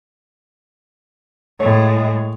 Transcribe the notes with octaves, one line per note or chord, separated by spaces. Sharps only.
A2 G#3 C#5